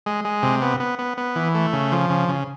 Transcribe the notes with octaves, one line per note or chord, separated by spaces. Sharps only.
G#3
G#3
C3
B3
B3
B3
B3
E3
A3
C#3
F3
C#3
C#3